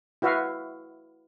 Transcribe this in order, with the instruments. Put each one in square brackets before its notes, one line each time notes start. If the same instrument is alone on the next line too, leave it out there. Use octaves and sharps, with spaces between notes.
[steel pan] E4 F#4 B4 E5 F5